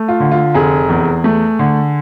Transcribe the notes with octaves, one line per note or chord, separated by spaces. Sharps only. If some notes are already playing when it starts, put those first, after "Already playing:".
Already playing: A3
F4
D3
F4
F1 G#4
E2
A3
D3